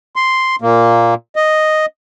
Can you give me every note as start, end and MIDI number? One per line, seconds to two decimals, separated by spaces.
0.16 0.56 84
0.62 1.14 46
0.62 1.14 58
1.36 1.86 75